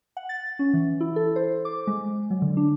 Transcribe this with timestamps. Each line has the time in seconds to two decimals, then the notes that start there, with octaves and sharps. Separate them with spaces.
0.17 F#5
0.29 A6
0.59 C#4
0.74 E3
1.01 E4
1.16 A4
1.36 C5
1.65 D6
1.87 G#3
2.31 F#3
2.42 D3
2.57 D4